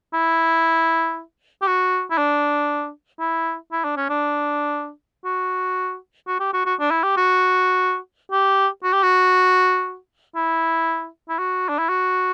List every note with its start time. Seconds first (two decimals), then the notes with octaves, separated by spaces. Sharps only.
0.14 E4
1.62 G4
1.67 F#4
2.10 E4
2.18 D4
3.20 E4
3.72 E4
3.84 D4
3.97 C#4
4.10 D4
5.25 F#4
6.27 F#4
6.40 G4
6.53 F#4
6.66 F#4
6.80 D4
6.91 E4
7.04 G4
7.17 F#4
8.32 G4
8.83 F#4
8.93 G4
9.03 F#4
10.36 E4
11.29 E4
11.39 F#4
11.69 D4
11.79 E4
11.89 F#4